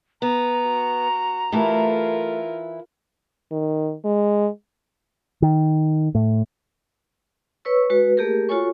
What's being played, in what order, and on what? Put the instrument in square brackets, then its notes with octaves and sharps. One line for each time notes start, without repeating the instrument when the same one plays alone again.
[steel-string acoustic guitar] B3 [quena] A#5
[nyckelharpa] F#4
[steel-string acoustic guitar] E3 E4 [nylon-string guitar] A3 G4 A4 [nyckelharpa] F4 A#4
[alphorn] D#3
G#3
[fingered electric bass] D#3
A2
[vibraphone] B4 C#5 C#6 E6
G#3 F#4 B4
A3 A#3 G4 G#4 A#4
F4 F#4 A4 C#5 G#5 C#6